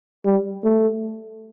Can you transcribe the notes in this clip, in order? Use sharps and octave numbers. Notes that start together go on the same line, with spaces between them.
G3
A3